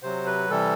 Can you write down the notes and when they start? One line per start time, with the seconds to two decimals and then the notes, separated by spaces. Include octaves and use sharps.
0.03 C3 F#3 C5
0.26 B4
0.50 C3 E3 G3 A4